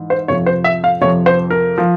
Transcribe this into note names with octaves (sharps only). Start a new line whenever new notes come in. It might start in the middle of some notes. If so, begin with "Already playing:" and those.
Already playing: G#2 E3
C5
F2 C3 F3 C#5
C5
E5
F5
F2 C3 F3 C#5
C5
A#4
F3